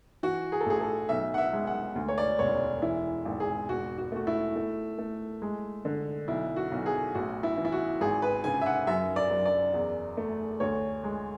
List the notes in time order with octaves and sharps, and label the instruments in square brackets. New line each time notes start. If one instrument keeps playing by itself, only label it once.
[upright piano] E3 F#4
G#4
A4
A1 G#4
A4
B1 E5
F#5
E5
G#3
F#5
D2
C#5
D5
E1 C#5
E3 E4
G#1
G#4
E1 F#4
F#4
A3 F#4
E4
A3
A3
G#3
D3
B1 E4
F#4
B1
G#4
A1 F#4
E4
E3
E4
F#4
G#1 G#4
B4
C#3 G#5
E5
F#5
F#2 E5
D5
F#2
D5
E2
A3
D2 C#5
G#3